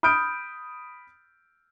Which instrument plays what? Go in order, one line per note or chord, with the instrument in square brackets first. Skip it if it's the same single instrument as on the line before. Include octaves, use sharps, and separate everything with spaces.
[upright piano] B5 D#6 F6 G6 D7